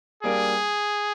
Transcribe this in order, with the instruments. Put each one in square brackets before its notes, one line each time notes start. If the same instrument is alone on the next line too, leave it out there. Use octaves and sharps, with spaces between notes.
[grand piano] G3 A#3 D4 [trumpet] G#4